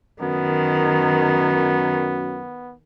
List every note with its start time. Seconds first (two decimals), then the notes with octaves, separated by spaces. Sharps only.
0.22 F#2 D#3 B3